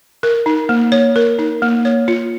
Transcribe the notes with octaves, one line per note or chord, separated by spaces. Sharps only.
A#4
D#4
A#3
C#5
A#4
D#4
A#3
C#5
F4